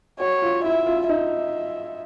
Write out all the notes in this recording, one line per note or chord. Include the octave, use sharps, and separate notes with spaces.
F#4 C#5
F4
E4 E5
F4
D#4 E5